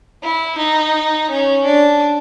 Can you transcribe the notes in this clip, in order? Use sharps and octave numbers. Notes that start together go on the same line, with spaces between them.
E4
D#4
C#4
D4